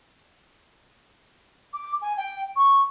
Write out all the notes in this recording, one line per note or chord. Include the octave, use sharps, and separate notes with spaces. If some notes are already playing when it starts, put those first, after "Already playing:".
D6
G#5
G5
C#6